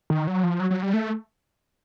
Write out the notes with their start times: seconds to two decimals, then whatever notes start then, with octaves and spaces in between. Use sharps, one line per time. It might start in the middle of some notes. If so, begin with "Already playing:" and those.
0.10 D#3
0.27 F#3
0.44 F3
0.60 F#3
0.71 F#3
0.83 G3
0.94 A3